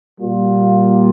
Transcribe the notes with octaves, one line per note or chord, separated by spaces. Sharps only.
A#2 G3 A#3 F4